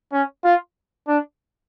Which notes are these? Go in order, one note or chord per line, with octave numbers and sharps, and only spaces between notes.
C#4
F4
D4